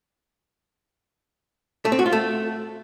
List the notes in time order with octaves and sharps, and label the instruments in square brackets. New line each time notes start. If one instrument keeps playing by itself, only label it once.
[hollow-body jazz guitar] A3
C4
F#4
F4
A3